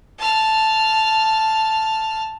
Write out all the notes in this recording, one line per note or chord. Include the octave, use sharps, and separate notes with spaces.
A5 F6